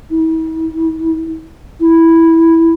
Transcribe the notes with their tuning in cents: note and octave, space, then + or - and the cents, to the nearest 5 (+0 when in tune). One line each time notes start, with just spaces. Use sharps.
E4 -45
E4 -5